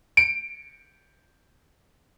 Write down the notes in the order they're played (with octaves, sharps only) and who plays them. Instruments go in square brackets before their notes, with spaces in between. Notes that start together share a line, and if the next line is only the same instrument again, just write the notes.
[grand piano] C#7 D7